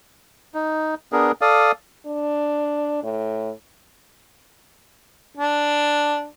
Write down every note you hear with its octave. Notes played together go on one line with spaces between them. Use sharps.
D#4
B3 D4 G#4 A#4
A4 D5 F5 D#6
D4
A2
D4